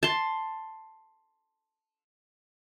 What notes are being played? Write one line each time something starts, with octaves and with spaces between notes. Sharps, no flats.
A5 C6